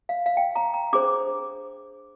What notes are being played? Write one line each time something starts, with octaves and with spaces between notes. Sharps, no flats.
F5
F5
G5
A#5
A#5
D4 G#4 C5 D6